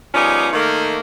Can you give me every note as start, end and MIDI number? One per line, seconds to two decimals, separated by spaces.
0.14 0.48 53
0.14 0.48 55
0.14 0.48 59
0.14 0.48 61
0.14 0.48 63
0.14 0.48 68
0.53 0.99 51
0.53 0.99 57
0.53 0.99 58